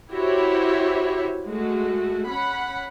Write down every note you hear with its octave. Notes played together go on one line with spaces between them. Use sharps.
E4 F#4 G4 C5 C#5 E5
G#3 A3 F#4
C#4 F#5 B5